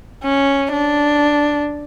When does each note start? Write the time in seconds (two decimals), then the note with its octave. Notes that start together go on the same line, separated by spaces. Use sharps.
0.24 C#4
0.73 D4